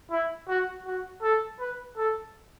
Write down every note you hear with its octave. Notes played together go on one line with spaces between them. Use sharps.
E4
F#4
F#4
A4
B4
A4